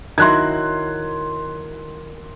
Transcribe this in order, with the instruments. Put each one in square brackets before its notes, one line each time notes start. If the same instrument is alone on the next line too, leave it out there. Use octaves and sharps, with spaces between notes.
[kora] D#3 F#3 E4 [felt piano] C6 F#6 G#6